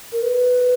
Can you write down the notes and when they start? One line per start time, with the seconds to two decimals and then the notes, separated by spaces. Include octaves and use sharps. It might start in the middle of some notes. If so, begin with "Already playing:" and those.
0.12 A#4
0.23 B4